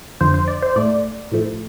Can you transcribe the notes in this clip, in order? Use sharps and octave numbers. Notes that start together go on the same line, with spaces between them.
F2 D3 F3 C5
C5
D5
C5
A2 A3 D5
A2 F3 A3